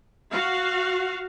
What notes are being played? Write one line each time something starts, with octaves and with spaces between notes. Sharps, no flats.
F#4 F5